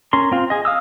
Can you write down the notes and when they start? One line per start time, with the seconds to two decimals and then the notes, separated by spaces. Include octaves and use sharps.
0.13 C#4 A#4 C6
0.32 C4 F4
0.50 G#4 D#5
0.65 F5 D#6 E6